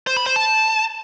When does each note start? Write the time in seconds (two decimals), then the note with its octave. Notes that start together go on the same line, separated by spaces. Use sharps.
0.07 C5
0.17 B5
0.26 C5
0.36 A5